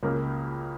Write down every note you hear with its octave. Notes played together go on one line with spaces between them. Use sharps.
C#2 C#3 A#3